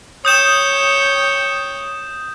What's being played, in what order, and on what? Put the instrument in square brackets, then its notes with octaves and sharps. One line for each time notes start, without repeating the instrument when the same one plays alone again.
[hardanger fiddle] C#5 G5 [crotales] D#6 G6 E7